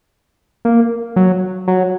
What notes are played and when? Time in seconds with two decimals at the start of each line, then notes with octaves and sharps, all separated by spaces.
0.65 A#3
1.16 F#3
1.68 F#3